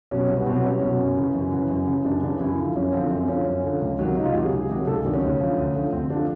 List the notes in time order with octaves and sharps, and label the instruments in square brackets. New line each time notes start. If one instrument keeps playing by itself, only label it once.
[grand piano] B2 F#3 C#4
C2
B3
B2 F#3 C4
B3
C2 C#4
B2 F#3
F#2
C#3 E3
F#2
C#3 E3
F#2
C#3 E3
F#2 D4
C#3 E3 D4
F#2 E4
D3 F3
F#2 C#4
D3 F3 C4
F#2 C4
D3 F3 C#4
F#2
D3 F3
C#2
C3 D#3 F#3
C#2 D#4
F4
C3 D#3 F#3 G4
G#4
C#2
C3 D#3 F#3
C#2 A4
G#4
C3 D#3 F#3 D4
C#4
D2
D3 F3
D2
D3 F3
D2 C4
D3 F3 D4